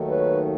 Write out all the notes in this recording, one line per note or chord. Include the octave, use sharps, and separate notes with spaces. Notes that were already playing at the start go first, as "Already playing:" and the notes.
Already playing: D#2 D#3 F#3 A3
B4 C#5